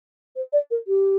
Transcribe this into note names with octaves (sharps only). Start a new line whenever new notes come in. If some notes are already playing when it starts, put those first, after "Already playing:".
C5
D5
A#4
G4